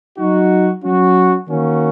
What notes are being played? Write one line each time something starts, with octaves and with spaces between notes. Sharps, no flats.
F#3 D#4 F#4
F#3 C#4 F#4
D#3 A#3 C#4 F#4